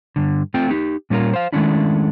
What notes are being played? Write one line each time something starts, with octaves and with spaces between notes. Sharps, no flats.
G2 D3
A3 C4 F4 G5
D#4 G4
A#2 G3 C#4 F4 A#4
C5 F5
D#3 G#3 A3 C#4 D4 E4